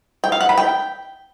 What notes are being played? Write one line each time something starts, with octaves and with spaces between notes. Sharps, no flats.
G5
F5
F#5
B5
G5